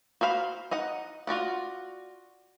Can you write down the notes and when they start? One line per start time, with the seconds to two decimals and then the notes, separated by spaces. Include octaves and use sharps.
0.21 F#4 C5 F5 B5
0.71 D#4 D#5 F#5
1.27 F4 F#4 D5 F#5